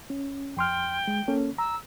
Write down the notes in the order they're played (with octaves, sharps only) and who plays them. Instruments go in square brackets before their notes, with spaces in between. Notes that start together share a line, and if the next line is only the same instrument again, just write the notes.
[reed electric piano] C#4
[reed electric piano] F2 C6 F6 [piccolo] G5
[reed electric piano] G#3
A#3 C#4 A4
[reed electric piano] A#5 [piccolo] E6